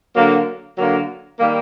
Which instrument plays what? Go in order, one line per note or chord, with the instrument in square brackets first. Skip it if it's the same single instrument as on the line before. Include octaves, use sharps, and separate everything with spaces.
[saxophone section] D3 F#3 A#3
D3 F#3 A#3
D#3 G3 A#3